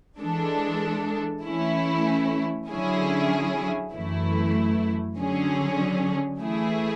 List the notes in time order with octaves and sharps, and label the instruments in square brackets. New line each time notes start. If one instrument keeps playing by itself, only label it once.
[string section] E3 G#3 D4 A4
E3 A3 C#4 E4
D3 F#3 C#4 E4 G#4
F#2 E3 A3 E4
D3 F#3 C#4 G#4
E3 A3 E4 G#4